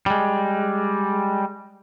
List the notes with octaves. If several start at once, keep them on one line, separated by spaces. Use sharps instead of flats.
G3 G#3